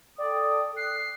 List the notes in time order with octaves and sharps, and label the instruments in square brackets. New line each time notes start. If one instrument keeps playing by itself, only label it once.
[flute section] A4 G5 D#6 [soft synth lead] D5
[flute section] F#6 [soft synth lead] C7